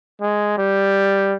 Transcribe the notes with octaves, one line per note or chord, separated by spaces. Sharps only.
G#3
G3